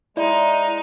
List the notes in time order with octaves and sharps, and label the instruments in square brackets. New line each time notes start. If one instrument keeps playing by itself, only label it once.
[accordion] G#3 [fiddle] D#4 [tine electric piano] E4 [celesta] D5